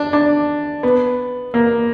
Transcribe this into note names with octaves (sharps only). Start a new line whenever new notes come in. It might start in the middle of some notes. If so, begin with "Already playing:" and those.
Already playing: D4
D4
B3
A#3